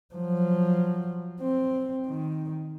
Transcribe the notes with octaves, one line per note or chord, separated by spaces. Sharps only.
F3 F#3
C4
D#3